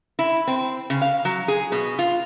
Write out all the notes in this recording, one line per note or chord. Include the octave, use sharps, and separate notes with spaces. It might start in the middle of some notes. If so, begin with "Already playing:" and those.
E4
C4
C#3
F5
F#3
G#4
B2
F4